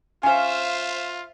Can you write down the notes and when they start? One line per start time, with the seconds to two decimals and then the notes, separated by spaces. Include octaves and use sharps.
0.23 C#4 F4 C5 E5 F5 G#5